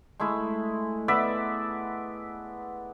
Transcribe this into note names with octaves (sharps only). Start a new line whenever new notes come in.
G#3 A3 E4
B3 D5 E5 B5